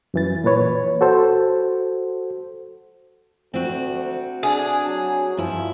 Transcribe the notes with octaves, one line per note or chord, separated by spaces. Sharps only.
F#2 E3 A6
A#2 E3 B4 C#5
F#4 A4 C5
D2 C4 F#4
D4 G#4
F#3
G2 F3 E4